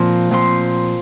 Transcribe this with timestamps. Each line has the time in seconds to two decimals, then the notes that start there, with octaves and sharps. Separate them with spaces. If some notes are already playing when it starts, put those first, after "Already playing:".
Already playing: A#2 F3 C4
0.31 A#2 F3 C4 C6